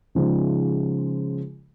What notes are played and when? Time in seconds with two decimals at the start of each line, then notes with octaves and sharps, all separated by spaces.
0.15 C#3 F3 G#3 D#4